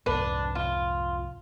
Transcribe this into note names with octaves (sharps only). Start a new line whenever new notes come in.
C2 F2 G#2 D4 B4
F4